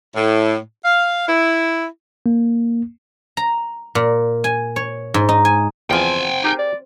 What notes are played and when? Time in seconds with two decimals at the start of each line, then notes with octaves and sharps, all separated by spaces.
0.15 A2
0.85 F5
1.29 E4
2.26 A#3
3.37 A#5
3.95 A#2
4.44 G#5
4.76 C#5
5.14 G#2
5.29 D#4
5.45 G#5
5.90 E2 F3 C4 F4 C5 G5 G#5
6.44 D#4 G4 G#4 A#4
6.59 D5